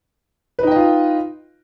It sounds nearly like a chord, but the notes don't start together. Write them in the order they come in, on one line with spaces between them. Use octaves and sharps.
B4 D#4 G5 D#5 F4